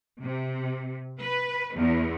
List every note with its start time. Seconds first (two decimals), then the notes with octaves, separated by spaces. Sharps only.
0.21 C3
1.20 B4
1.76 E2